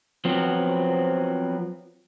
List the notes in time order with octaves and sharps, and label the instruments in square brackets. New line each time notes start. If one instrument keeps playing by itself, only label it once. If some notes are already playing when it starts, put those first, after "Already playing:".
[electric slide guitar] F3 F#3 B3 C4